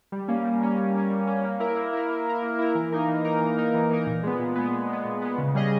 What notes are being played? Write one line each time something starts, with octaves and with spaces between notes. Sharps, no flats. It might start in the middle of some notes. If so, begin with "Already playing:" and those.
G3
A#3 C#4
G3
A#3 C#4
G3
A#3 C#4
G3
A#3 C#4
A#3
E4 A#4
A#3
E4 A#4
A#3
E4 A#4
A#3
E4 A#4
E3
A#3 D#4 A#4
E3
A#3 D#4 A#4
E3
A#3 D#4 A#4
E3
A#3 D#4 A#4
A#2
G#3 B3
A#2
G#3 B3
A#2
G#3 B3
A#2
G#3 B3
C#3
G3 C#4 G#4 D#5